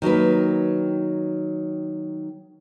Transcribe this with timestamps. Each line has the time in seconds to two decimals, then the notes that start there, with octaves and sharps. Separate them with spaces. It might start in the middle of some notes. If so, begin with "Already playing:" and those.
0.02 D#3 F#3 A#3 B4